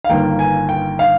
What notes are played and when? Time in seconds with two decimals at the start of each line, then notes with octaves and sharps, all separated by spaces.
0.04 F5
0.09 G1 G2 D#3 A#3 G5
0.39 G#5
0.69 G5
0.99 F5